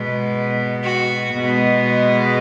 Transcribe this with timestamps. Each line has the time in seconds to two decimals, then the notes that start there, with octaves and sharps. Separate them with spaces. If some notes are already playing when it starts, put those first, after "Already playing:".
Already playing: B2 G#3 B3
0.83 F#4
1.30 B2 G#3 B3